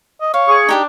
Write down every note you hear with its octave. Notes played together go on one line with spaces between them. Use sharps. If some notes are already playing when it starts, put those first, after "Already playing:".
D#5
C#5 F5
G#4 C#6
D4 D#4 G4 D#6